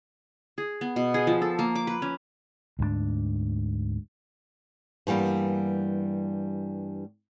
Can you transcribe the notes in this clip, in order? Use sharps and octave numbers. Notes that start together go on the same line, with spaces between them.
G#4
B3
B2
G#4
F3
A4
A#3
D6
B4
C#4
D2 G#2 G3 D4
G2 E3 G3 A#3 B3